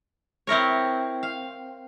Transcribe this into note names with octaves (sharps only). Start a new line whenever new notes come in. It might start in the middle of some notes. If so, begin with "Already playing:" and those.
C4 E4 A#4 C#5
F5